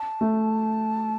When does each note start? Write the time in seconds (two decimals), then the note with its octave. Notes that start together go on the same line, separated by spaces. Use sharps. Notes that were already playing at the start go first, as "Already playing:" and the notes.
Already playing: A5
0.21 A3